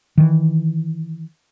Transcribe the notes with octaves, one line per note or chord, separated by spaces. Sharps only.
D#3 E3